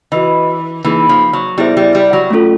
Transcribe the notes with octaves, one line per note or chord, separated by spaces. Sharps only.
E3 F#4 B4 D#5
E3 A#3 D#4 G#4
F3
F#3
G3 B3 E4 G#4 C5 E5
G3
G3
F#3
A3 C#4 F4 A4